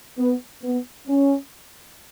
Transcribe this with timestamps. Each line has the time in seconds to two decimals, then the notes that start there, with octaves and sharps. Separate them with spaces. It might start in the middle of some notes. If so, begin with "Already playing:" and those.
0.19 B3
0.63 B3
1.08 C#4